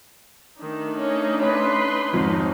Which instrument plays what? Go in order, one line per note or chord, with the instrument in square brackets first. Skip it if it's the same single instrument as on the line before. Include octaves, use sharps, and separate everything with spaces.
[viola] D#3 [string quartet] A3 D4 D#4
[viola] C#4
[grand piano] C#4 [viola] B4 C6
[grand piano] G#1 F2 G#2 [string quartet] C#4 D#4